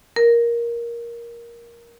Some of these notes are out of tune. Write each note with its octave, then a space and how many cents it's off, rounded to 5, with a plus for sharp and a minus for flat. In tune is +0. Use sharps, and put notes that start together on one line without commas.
A#4 +10